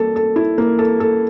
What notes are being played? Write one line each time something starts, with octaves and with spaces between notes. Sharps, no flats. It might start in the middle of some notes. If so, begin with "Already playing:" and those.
Already playing: G3 A#3 A4
A4
E4
A#3
A4
A4